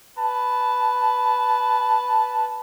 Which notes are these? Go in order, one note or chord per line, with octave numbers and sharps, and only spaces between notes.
B4 A5